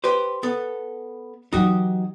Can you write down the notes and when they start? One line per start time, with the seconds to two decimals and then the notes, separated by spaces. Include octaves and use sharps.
0.04 G4 B4 C5
0.43 B3 A4
1.53 E3 F#3 D#4 F#4 G4